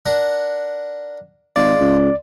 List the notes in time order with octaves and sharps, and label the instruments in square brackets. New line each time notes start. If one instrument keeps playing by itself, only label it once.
[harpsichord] D4 A#4 F#5
[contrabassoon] G#1 [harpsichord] G#3 F4 [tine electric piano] D5
[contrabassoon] C#2